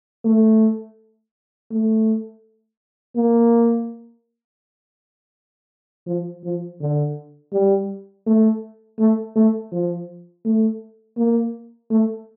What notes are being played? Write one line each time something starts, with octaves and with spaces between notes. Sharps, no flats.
A3
A3
A#3
F3
F3
D3
G3
A3
A3
A3
F3
A3
A#3
A3